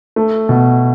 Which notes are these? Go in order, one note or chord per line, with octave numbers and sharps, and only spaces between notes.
A3
B2